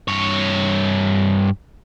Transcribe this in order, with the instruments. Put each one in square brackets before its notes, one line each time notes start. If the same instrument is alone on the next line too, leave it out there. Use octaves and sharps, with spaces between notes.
[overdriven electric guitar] G2 C#5